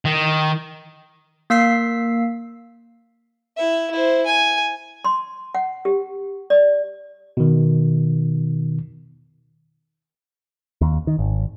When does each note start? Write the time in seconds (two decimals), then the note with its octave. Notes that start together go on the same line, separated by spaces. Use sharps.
0.05 D#3
1.50 A#3 F5 E6 B6 C7
3.57 E4 E5
3.91 E4 C5
4.26 G#5
5.05 C6
5.55 F#5
5.85 G4
6.50 D5
7.37 B2 D#3
10.81 D#2
11.07 D#3
11.19 G#1